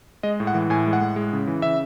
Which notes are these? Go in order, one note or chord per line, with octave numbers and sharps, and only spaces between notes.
G#3 D#5
A2
F#5
E3
A2 G#5
G#3
F#5
A2
G#3
C#3
E3
C#3 E5